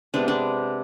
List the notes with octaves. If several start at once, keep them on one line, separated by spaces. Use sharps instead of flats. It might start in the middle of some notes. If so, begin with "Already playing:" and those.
C3 G#3 B3 D4
D4